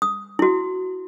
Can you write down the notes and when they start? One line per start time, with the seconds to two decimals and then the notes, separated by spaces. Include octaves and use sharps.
0.02 D#6
0.39 E4 F#4